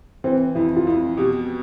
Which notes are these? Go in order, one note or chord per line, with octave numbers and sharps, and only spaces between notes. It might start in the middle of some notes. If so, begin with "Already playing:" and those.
E3 C4
F2 E4
F4
F2 E4
B2 G4